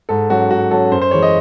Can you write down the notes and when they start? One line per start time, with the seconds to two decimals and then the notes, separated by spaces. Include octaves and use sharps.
0.09 G#2 A4
0.30 F#3 C#4 F#4
0.50 G#2 F#4
0.71 F#3 C#4 A4
0.91 F#2 C5
1.01 C5
1.11 E3 G#3 C#4 C#5
1.22 D#5